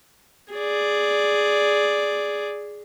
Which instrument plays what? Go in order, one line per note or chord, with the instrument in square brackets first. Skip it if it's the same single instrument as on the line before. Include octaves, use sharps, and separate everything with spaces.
[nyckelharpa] G#4 D5